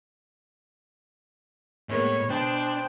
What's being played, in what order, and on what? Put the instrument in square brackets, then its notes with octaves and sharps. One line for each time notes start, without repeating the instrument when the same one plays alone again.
[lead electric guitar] A2 [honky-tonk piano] G#3 A#3 B3 [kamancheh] C#5
[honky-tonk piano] B2 [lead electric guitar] D4 [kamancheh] C5 [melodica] G5